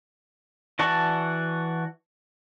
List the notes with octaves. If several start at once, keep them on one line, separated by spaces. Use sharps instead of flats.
E3 F#4 D5 A5 C#6